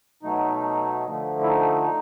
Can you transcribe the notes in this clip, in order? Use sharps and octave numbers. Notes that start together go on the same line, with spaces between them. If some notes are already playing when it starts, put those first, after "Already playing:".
B2 F#3 A3 D#4
D3 F3 A3
E4
D#4